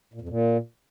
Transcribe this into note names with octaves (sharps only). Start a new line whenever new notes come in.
A#2
F2
A#2